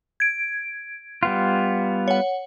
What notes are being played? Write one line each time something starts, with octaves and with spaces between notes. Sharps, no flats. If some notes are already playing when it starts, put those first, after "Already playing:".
G#6 D7
G3 B3 F4
C#5 F#5